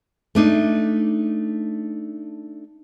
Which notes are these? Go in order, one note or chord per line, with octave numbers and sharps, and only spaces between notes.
A3 D4 D#4